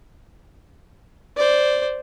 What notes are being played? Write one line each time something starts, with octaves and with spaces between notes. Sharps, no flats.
C5 D5